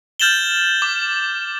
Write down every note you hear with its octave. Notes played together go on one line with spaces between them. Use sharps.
F6 G6 A6 E7 F#7 G7
D6